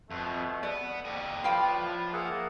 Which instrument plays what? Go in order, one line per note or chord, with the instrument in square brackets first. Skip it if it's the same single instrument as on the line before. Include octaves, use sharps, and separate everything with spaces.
[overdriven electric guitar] F2 [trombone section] B2 A3
[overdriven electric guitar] B3 [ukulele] D5
[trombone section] F2 D3 G3 [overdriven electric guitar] G4 D#5
[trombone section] A2 D4 F4 [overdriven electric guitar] F3 [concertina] B4 [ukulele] F5 G5
[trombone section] A#3 [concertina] G#4 E5 F#5